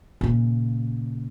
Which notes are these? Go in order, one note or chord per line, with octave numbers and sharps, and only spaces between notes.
A#2 C#3